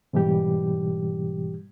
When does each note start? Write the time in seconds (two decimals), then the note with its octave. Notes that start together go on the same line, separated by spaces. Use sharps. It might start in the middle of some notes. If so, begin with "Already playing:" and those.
0.13 G#2 B2 E3 G3 G4